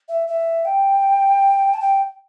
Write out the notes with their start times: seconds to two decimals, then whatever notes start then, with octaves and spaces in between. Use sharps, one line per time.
0.09 E5
0.27 E5
0.65 G5
1.74 A5
1.80 G5